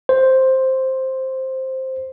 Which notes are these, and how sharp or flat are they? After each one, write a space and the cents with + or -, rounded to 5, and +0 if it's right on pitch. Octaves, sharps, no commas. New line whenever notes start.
C5 +5